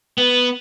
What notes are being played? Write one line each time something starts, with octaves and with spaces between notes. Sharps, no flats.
B3